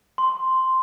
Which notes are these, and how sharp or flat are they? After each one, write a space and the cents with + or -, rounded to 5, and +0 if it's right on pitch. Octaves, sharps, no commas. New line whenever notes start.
C6 +0